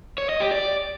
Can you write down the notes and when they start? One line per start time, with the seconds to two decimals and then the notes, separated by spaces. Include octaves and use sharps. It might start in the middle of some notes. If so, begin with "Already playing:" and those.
0.18 C#5
0.29 D#5
0.40 G4
0.51 D5